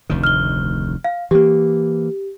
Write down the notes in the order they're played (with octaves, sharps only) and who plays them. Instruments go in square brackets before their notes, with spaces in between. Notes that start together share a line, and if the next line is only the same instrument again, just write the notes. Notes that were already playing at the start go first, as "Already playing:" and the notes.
[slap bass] F1 D2 D#3
[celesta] F6 G7
F5
[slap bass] E3 A#3 [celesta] G4